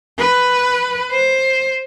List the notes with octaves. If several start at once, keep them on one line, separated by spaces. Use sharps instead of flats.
B4
C5